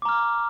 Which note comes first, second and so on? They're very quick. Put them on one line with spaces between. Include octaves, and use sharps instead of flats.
D6 A#5 F6